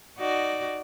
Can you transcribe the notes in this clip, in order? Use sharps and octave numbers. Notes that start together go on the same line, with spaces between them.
D#4 F#4 D5